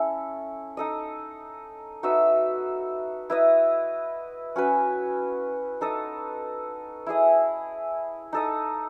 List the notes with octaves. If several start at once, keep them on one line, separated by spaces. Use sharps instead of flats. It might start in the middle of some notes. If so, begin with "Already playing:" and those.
Already playing: C#4 E4 A4
D#4 A4 D#5
D#4 F#4 B4 E5
E4 B4 D#5
C#4 F#4 B4
D#4 A4 D#5
E4 G#4 D#5
D#4 A4 D#5